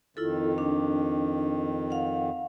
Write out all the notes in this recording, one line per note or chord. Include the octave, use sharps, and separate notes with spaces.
F2 D#3 E4 F4 A4
D4
F5 F#5